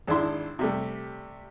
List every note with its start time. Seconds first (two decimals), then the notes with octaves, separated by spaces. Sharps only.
0.08 G#1 D4 E4 C6
0.59 C3 G3 A3